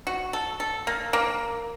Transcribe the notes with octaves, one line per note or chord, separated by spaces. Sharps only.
F#4
A4
A4
A#3
A#3